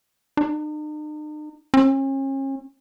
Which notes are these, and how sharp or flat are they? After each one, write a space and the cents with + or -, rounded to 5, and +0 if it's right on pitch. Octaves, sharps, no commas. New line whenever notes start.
D#4 -45
C#4 -40